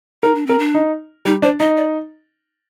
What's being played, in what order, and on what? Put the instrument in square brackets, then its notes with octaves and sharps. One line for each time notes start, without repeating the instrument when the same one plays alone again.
[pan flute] D#4 [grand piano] A#4
[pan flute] D4
[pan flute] C4 [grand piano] A#4
[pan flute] D4
[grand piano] D#4
[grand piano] G3 [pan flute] D#4
[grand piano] D4 [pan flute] C5
[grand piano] D#4 [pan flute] D#5
[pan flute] D5